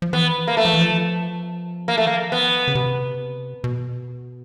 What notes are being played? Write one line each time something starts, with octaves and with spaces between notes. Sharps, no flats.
F3
E3 B3
A#3
A3
F3
E3
F3
A#3
A3
A#3
B3
C#3
C3
B2